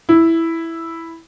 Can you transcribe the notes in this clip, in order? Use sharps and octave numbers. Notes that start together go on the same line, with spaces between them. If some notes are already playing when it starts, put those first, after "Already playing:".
E4